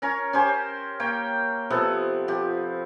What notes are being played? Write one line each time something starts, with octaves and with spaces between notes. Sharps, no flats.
C#4 A#4 C#5
C#4 G4 C5
A#3 C#5 G5
C3 F3 B3 A4
F3 G4